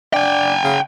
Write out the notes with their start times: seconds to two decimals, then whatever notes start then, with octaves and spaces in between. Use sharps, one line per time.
0.14 D4 G5 G#5
0.64 C#3